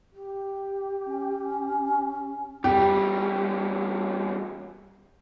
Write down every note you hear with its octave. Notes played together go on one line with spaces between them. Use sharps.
G4
C#4
E2 G3 G4